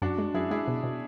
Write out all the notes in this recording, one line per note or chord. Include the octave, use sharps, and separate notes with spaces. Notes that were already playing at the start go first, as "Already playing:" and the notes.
F#2 D4 F#4
G#3
F#2 E4 G#4
G#3 E4 G#4
B2
B2